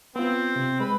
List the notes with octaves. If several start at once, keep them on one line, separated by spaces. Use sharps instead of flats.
B3 C4 F4
C3
G#3 B4 B5